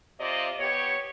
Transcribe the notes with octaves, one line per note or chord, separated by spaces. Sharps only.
C3 F4 D5 D#5
B3 G4 C#5